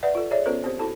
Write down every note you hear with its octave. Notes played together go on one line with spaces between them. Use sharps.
B4 D5 E5 F#5
F4 A4
G#4 C#5 D5 E5
B3 C#4 F4 A4 A#4 C5
C4 G4 C5
E4 F#4 A4 A5